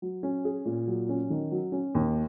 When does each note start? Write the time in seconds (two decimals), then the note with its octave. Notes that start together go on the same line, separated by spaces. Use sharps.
0.02 F#3
0.23 C#4
0.45 G#4
0.65 A#2
0.87 F#3
1.09 C#4
1.30 D#3
1.51 F#3
1.72 C#4
1.95 D#2